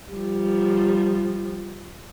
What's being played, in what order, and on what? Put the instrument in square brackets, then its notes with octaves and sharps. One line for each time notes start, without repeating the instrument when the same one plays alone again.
[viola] F3 G3